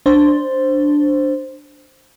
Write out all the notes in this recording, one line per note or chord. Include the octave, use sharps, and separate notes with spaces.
D4 C5